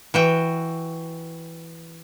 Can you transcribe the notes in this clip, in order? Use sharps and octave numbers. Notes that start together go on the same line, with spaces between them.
E3 F#4 G5